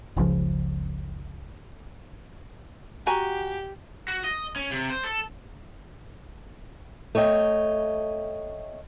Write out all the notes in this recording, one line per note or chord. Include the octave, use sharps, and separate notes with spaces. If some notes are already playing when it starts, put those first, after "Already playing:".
F#1 C#2 C#3 F3
F#4 G4 G#5 A#5
F#4
D#5
C#4
C3
C5
A4
A3 C#5 D#5 G5